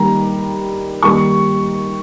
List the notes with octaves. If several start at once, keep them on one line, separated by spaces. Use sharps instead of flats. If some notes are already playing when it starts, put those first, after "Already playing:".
Already playing: D#3 G3 A#3 A#5
D#3 G3 A#3 C#6